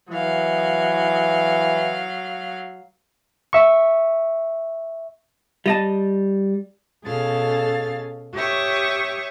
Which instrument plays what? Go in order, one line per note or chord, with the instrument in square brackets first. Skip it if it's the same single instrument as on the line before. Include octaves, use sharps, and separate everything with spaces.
[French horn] E3 [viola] F#3 F5
[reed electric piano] E5 C#6
[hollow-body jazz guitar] G3 D#5 A5
[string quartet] B2 C#4 G#4 A4 F5 A6
G4 C#5 E5 C#6 D#6